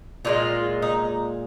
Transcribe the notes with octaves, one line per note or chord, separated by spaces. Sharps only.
A#2 F3 G#3 F4
D#4